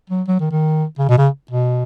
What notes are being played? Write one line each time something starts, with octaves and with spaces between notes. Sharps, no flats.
F#3
F#3
D#3
D#3
C#3
B2
C#3
B2